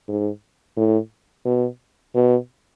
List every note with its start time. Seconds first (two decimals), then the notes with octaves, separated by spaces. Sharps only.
0.08 G#2
0.76 A2
1.45 B2
2.15 B2